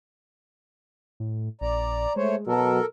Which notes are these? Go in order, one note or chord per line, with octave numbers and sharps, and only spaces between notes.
A2
A#1 D5 A#5
G#3 A3 C5 C#5
B2 F#3 A4 A#4